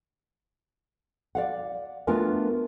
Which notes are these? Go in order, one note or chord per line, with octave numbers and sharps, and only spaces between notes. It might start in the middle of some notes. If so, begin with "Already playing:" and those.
D5 F5 F#5
A3 B3 D4 F4 A#4 G#5